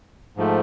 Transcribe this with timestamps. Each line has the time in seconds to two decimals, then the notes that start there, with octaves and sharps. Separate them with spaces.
0.37 G#2 F3 A3